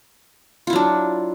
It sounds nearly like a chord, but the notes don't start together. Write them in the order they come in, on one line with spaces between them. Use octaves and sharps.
F4 E4 F#3 D4